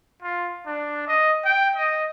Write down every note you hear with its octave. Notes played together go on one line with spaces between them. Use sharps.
F4
D4
D#5
G5
D#5